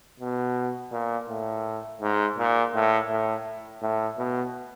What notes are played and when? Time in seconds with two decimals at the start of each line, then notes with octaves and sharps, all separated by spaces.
0.20 B2
0.92 A#2
1.29 A2
2.01 G#2
2.38 A#2
2.74 A2
3.10 A2
3.82 A2
4.18 B2